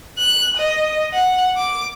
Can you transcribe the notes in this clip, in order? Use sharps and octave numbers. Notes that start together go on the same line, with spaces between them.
F#6
D#5
F#5
D6